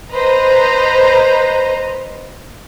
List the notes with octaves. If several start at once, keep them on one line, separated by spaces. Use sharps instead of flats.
B4 C5 D#5 A#5